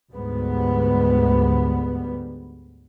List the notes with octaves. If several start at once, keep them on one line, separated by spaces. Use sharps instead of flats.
D2 G#2 G3 B3